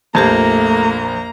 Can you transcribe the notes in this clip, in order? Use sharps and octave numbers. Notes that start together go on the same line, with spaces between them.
A#1 F2 A3 A#3 G4 A#5 G#6